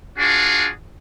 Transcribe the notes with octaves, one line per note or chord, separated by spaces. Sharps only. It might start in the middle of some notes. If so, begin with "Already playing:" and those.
D4 F4 F#4 G#4